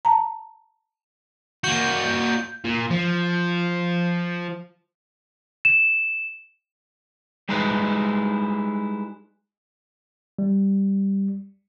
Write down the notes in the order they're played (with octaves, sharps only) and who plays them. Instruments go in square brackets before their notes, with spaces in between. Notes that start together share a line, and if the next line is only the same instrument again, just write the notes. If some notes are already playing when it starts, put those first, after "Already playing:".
[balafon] A5 A#5
[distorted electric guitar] A#3 F#4 [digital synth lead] G6
[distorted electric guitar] A#2
F3
[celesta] E7
[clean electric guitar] G3 G#3 D#4 E4 B4 C5
[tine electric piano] G3